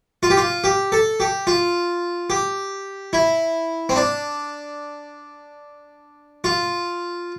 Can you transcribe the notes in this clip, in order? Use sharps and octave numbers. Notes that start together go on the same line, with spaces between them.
F4
G4
F4
G4
A4
G4
F4
G4
E4
C4
D4
F4